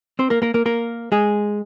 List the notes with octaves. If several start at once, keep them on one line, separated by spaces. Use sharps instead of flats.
C4 C5
A#3 A#4
A#3 A#4
A#3 A#4
A#3 A#4
G#3 G#4